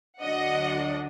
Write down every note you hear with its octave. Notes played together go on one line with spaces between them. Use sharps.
D2 D3 F#3 D4 D#5 F#5